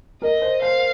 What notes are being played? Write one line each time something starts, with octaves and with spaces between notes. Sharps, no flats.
A#4 D#5
C5
C5 F5